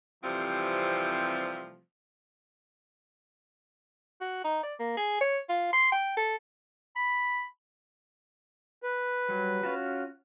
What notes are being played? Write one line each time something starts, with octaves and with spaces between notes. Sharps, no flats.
C3 E3 F3 G3 A3 C4
F#4
D#4
D5
A#3
G#4
C#5
F4
C6
G5
A4
B5
B4
F#3 G3
C#4 F4 F#4